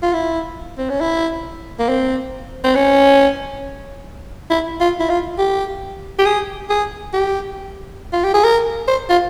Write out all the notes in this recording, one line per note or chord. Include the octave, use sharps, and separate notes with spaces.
F4
E4
C4
C#4
E4
A#3
C4
C4
C#4
E4
F4
E4
F4
G4
G4
G#4
G#4
G4
F4
G4
G#4
A#4
C5
F4